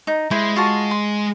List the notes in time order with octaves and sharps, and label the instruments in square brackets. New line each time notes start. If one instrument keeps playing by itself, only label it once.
[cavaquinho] D#4
[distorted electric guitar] G#3 [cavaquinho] E4 C5
[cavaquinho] F4 F#4 A5
C6